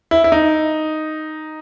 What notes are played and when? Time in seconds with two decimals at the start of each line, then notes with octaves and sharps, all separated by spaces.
0.11 E4
0.24 E4
0.32 D#4